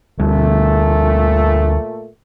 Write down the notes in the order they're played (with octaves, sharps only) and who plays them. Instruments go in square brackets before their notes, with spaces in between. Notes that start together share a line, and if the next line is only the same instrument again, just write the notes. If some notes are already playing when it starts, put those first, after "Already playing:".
[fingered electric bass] D2 D3 G3 [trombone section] A#2 A3